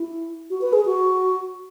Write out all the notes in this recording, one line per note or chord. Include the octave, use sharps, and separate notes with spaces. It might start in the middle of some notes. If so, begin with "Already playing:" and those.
Already playing: E4
F#4
B4
G#4
F#4